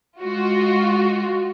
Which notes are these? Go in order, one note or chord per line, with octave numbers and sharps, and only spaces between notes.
G#3 F4 F#4